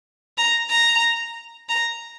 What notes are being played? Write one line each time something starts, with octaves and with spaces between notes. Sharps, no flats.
A#5
A#5
A#5